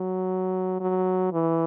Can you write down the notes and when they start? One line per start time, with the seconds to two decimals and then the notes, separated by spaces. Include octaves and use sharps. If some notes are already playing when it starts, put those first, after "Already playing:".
Already playing: F#3
0.80 F#3
1.32 E3